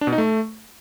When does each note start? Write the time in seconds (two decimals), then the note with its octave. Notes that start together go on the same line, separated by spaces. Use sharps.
0.01 D4
0.07 B2
0.13 D#4
0.18 A3